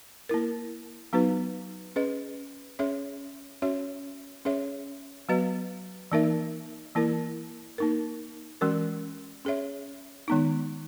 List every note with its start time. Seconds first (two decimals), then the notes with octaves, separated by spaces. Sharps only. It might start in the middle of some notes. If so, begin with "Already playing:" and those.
0.29 A#3 E4 A#4
1.13 F#3 B3 D#4 F#4 B4
1.96 C#4 G#4 B4 D#5
2.79 C#4 G#4 C#5 E5
3.62 C#4 F#4 C#5 E5
4.45 C#4 G#4 C#5 E5
5.29 F#3 B3 F#4 B4 D#5
6.12 E3 A#3 D#4 A#4 E5
6.95 E3 A#3 E4 A#4
7.78 A#3 D#4 A#4
8.61 E3 G#3 C#4 F#4 A#4
9.45 C#4 G#4 C#5 E5
10.28 D#3 G#3 B3 D#4